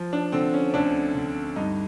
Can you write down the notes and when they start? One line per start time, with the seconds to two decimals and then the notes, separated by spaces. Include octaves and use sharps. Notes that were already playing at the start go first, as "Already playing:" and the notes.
Already playing: F3
0.13 D4
0.32 D3 C4
0.54 C#4
0.74 D2 D4
1.15 D2
1.56 G2 D#4